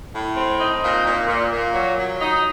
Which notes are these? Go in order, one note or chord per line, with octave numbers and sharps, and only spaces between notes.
A2
C4
D#4
A#2
A#2
A#2
A#2
F#3
F#3
D#4